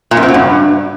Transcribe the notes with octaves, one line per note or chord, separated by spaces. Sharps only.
A#2
F#2
C4
F#3
G2